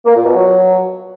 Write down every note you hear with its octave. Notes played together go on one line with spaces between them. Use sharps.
A#3
A#2
B2
F#3